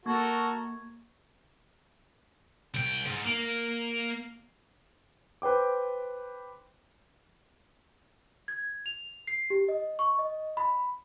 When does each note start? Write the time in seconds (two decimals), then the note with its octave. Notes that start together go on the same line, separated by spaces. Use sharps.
0.06 A#3 F#4 A4 A#4 C#6 G#6
2.74 C2 G5
3.06 G#2
3.25 A#3
5.42 B4 C5 G5 D6
8.48 G#6
8.86 F7
9.27 C7
9.50 G4
9.68 D#5
9.99 C#6
10.19 D#5
10.57 B5